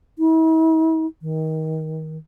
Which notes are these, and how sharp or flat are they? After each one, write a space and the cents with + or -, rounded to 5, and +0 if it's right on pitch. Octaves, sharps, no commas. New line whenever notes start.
E4 -45
D#3 +25